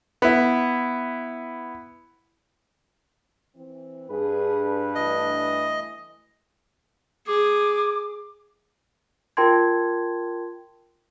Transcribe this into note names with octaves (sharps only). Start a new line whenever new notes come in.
B3 E4
E3 C4
G2 D4 G#4 B4
E3 A3 D#5
G#4 D6
F4 A#4 G5 A5 C6 G#6